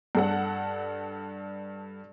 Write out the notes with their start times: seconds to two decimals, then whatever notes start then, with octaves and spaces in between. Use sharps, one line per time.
0.15 G2 A4 F#5